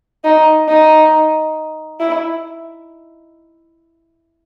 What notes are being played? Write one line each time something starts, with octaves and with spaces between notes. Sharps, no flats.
D#4
D#4
E4